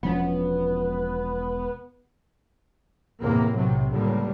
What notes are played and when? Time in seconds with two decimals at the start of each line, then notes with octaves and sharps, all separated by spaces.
0.03 E1 F3 B3 C#4
3.21 E2 A2 C3 A#3
3.52 B1 C3 F#3
3.91 C#2 A2 D3 G3 A#3